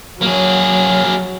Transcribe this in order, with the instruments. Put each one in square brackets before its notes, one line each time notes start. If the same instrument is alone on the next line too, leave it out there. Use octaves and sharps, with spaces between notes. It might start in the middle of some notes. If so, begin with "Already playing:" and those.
[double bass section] F#3 [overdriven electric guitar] A#3 G#4